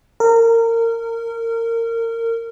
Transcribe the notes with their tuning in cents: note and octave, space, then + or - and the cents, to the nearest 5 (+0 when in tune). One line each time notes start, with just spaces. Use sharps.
A#4 -25